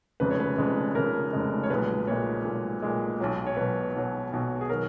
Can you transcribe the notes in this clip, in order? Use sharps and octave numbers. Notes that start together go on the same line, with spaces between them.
F1 F2 C#3 G#3 B4
C#5
B4
F1 F2 C#3 G#3
F1 F2 C#3 G#3 A#4
F1 F2 C#3 G#3
C#5
B1 A#2 G#3 B4
B1 A#2 G#3 C#5
B1 A#2 G#3
B1 A#2 G#3
B1 B2 F#3
C#5
B1 B2 F#3 B4
B1 B2 F#3
B1 B2 F#3
G#4
D#3 F#3 A#4